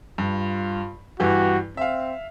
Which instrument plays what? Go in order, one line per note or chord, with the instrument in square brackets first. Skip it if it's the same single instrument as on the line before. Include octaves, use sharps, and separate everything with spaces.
[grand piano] G2 [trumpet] F4
[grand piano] G2 E3 G4 [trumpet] F#4
[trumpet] C4 [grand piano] E5 F5